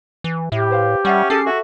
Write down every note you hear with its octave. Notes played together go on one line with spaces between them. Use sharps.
E3
A2 G4 E5
B4 C5 F5
G3 C#4 E5 F#5 G5
C#4 G#4 A4 D6 C7
F#4 A4 E5